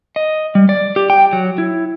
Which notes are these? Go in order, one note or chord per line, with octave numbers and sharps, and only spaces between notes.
D#5
G3
D5
G4
G5
F#3
E4